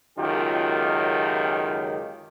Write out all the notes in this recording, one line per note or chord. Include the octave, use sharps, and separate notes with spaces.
C#2 F#2 D#3 F4 G4